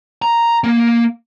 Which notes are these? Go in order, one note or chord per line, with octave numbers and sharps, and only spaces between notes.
A#5
A#3